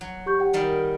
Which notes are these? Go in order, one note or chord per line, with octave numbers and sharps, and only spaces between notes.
F#3
G4 C#6 G6
G4 F#5 G5
D#3 G3 A#4